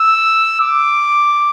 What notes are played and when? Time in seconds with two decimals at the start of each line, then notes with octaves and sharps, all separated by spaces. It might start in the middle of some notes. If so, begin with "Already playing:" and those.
Already playing: E6
0.61 D6